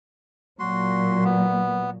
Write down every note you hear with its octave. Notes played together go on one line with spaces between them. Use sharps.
A#2 F#3 F#4 C6
B3